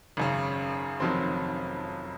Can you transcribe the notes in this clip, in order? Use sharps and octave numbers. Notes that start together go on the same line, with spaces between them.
G#1 F#2 C#3
F1 F2 D#3 F#3 C4